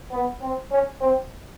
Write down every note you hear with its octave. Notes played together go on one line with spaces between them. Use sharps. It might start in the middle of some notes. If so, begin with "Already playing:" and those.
B3
C4
C#4
C4